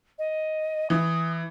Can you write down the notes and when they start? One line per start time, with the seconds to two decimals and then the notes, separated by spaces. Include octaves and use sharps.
0.19 D#5
0.90 E3 D#6